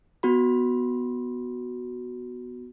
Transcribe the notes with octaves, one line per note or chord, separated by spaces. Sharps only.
B3 F#4 B5